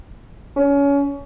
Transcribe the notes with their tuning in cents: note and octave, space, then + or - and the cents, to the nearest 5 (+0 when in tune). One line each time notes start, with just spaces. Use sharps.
C#4 +25